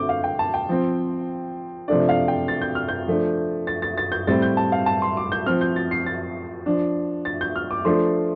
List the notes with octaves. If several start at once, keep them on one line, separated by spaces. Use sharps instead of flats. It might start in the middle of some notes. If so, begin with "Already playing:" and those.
Already playing: D3 A3 C4 D6 G6
F5
G5
A5
G5
F3 C4
C3 F3 A3 D4 D5
F5
G5
A6
G6
F6
G6
F3 A3 D4
A6
A6
A6
G6
A2 G3 C4 A6
G6
A5
F5
A5
C6
D6
G6
F3 C4 F6
G6
A6
C7
A6
F3 D4
A6
G6
F6
D6
F3 A3 D4 C6